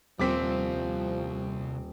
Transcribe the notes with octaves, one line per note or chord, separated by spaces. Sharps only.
D#1 C2 C3 F3 C4 D6 B6